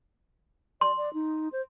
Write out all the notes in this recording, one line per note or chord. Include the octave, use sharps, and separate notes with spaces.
D5 C6
D5
D#4
C5